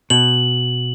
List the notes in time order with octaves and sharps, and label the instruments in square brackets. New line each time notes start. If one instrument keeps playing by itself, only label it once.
[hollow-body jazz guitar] B2 [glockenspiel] F#7